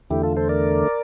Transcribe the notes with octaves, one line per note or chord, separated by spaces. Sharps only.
E2 D3 A3 E4 G4
F4 A4
A4 C5
A#4 D5